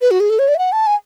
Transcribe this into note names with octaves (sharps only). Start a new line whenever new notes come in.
B4
F#4
G#4
A4
C#5
D5
E5
F#5
A5
G#5